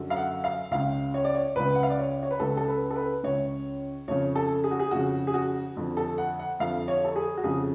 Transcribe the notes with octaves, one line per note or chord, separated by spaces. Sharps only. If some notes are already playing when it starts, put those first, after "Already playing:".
Already playing: F#2 D3
F5
F#5
F5
C#2 C#3 F5
C#5
D5
C#5
C#2 C#3 B4
F#5
F5
D5
C#5
C#5
B4
C#2 C#3 A4
A4
B4
A4
B4
C#2 C#3 C#5
F2 C#3 C#5
A4
G#4
F#4
G#4
F2 C#3 F#4
G#4
F#4
F2 D3
A4
F#5
F#5
F2 D3 F5
C#5
A4
G#4
F#4
F2 C#3 G#4